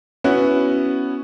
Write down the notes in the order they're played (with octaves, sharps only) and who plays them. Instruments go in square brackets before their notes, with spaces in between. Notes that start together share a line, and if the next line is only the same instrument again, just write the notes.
[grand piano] B3 C#4 E4 F#4